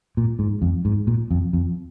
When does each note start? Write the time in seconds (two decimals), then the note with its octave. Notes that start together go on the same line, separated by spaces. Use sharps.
0.17 A#2
0.39 G#2
0.62 F2
0.85 G#2
1.07 A#2
1.31 F2
1.53 F2